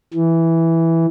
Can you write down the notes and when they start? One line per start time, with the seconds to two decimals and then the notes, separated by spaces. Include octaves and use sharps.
0.14 E3